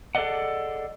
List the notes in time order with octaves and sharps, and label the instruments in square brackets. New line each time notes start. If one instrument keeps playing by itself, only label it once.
[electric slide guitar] G#4 A4 C5 D5 D#5 F#5